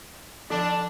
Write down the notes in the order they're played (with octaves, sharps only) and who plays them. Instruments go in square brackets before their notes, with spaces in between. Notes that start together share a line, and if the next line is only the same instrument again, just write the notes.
[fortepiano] D3 D5 [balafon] F3 [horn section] D4